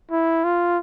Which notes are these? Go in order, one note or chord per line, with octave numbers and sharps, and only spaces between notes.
E4
F4